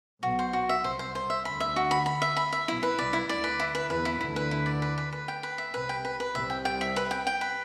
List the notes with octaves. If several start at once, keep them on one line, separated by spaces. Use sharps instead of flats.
B1 B2 F#4
C5
F#4
E5
C2 C3 C5
C5
C5
E5
D2 D3 B5
E5
F#4
B5
B5
E5
B5
E5
B1 B2 E4
B4
C2 C3 D5
E4
D2 D3 D5
B4
E4
B4
E2 E3 B4
E4
D2 D3 E4
B4
E4
D5
B4
B4
B4
G5
B4
E5
C2 C3 B4
G5
B4
B4
C2 C3 E5
G5
G5
E5
B4
G5
G5
B4